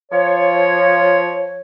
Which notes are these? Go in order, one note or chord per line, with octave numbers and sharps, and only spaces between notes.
F3 C#5